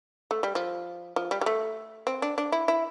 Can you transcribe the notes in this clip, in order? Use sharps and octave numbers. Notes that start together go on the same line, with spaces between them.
A3
G3
F3
F3
G3
G3
A3
C4
D4
D4
E4
E4